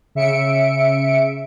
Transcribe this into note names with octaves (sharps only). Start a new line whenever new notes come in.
C#3 E5 C#7 D7